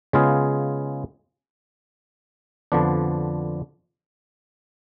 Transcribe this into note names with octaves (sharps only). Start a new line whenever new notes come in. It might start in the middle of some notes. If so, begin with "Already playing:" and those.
C#3 G#3 B3 F4 G#4
F2 D3 F3 B3 D4